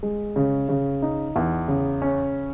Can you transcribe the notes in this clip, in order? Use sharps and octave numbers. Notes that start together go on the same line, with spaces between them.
G#3
C#3
C#3
D#4
E2
C#3
C#4